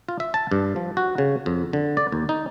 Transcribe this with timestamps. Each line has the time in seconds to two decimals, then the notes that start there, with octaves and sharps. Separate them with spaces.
0.09 F4
0.20 E5
0.34 A5
0.52 G2
0.76 F3
0.97 F#4
1.18 C#3
1.46 F2
1.73 D3
1.97 D5
2.12 D#2
2.29 D#4